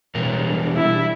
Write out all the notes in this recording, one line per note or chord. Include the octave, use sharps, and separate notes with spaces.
B2 E3 G3 D4 A#4
E4